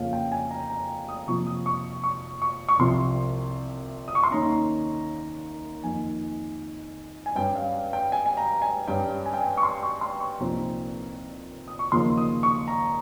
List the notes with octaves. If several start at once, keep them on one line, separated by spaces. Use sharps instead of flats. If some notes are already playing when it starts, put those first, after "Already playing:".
Already playing: F2 C#3 F3 A#3 C#4 F5
G5
G#5
A#5
A#5
D#6
F2 C3 F3 A#3 C#6
D#6
C#6
C#6
C#6
C#6
C2 C3 F3 C6
D#6
C#6
C6
D#2 D#3 A#3 C#4 A#5
F2 D#3 A#3 D#4 G#5
G#5
G2 G3 C#4 G5
F5
G5
G#5
G#5
A#5
G#5
G2 G3 C#4 G5
G#5
G5
G#5
C#6
C6
C#6
C6
C#6
C2 A#2 F3 C4 D#4 A#5
D#6
C#6
D#2 C#3 F3 A#3 D#4 C6
D#6
C#6
A#5